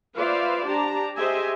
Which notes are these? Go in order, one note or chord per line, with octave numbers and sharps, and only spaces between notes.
F4 B4 C5 D5 E5 F5
D4 G4 A5 A#5
G4 G#4 C5 D#5 E5 G#5